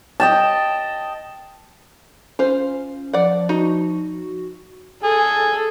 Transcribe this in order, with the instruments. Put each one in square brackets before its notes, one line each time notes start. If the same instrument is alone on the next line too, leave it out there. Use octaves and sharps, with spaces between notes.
[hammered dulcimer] D#5 G5 A5
[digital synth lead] C#4 [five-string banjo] F4 C5
[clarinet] F3 [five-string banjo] D5 F#5
[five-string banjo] D#4 [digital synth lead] F#4
[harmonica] G#4 [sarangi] A4